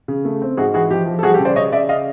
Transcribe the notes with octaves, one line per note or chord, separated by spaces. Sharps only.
C#3
A3
C4
G#2 F#4 G#4
E3 F#4 G#4
F3 G4
F3
A4
G3 F#4 G#4
G4 A4
C#3
C5 D5
C#3 C#5 D#5
C#3 D5 E5
D#5 F5